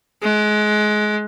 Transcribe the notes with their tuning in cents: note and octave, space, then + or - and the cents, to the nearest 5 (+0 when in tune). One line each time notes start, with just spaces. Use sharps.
G#3 +25